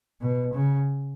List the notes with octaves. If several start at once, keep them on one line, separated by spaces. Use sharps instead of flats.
B2
C#3